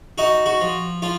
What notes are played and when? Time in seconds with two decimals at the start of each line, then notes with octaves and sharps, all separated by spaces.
0.18 D#4 F#4
0.46 F#4
0.61 F3
1.02 F3 F4